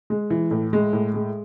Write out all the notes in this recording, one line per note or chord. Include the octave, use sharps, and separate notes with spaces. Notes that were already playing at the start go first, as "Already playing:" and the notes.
G#3
E3
A2
G#3
A2
G#3